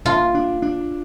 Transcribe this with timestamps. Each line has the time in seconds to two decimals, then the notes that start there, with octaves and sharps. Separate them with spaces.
0.05 A#2 F4
0.35 D4
0.62 D4